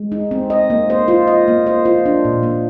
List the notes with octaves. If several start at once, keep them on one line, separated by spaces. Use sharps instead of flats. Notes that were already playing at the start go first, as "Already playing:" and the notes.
Already playing: G#3
D#4
C4
D#5
A#3
C5
F4
D#5
A#3
C5
F4
D4
A#2
A#3